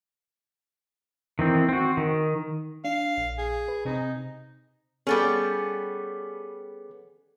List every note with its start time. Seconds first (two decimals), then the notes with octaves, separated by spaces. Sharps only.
1.39 D#3 E3 C4
1.69 C4 F#4
1.97 D#3
2.85 D4 F5
3.17 A#1
3.38 G#4
3.68 B4
3.85 C3 C4 D#4
5.07 G3 B3 C#4 G#4 A4 A6